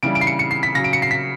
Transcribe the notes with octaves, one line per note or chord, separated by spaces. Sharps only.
C#3 E3 G3 D7
D7
C7
C#7
C#7
C7
B6
C#3 F#3 A#6
D7
C#7
C7
B6